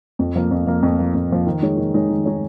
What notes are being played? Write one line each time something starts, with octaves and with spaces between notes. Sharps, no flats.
F2
F3 A#3
F2
F3 A#3
F2
F3 A#3
F2
F3 A#3
D#3
G#3 D#4 G#4 C#5
D#3
G#3 D#4 G#4 C#5
D#3
G#3 D#4 G#4 C#5